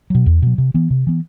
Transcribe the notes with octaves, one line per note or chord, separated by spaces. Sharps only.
B2 F#3
E2
B2 F#3
C3
E3 B3
C3
E3 B3